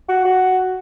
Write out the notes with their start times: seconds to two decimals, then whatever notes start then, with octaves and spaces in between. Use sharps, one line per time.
0.09 F#4
0.25 F#4